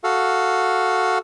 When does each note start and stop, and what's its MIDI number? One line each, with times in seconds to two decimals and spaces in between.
0.04 1.18 66
0.04 1.18 69
0.04 1.18 77